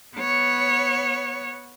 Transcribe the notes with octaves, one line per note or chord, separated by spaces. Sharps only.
B3 C#5